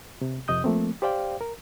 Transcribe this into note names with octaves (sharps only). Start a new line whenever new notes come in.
C3
F2 C3 D#5 D#6 G6
F3 A3 A#3 C4
G4 C5 D5 F5 G5
A#4